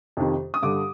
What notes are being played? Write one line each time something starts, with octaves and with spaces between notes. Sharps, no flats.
F2 C3 D#3
D#6
G2 D3 D6